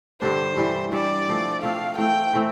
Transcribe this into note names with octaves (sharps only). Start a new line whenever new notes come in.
G2 D3 G3 D4 C5
G2 E3 G3
G2 E3 G3 D5
F3 A3 C4
F3 A3 C4 F5
E3 A3 C4 G5
E3 A3 C4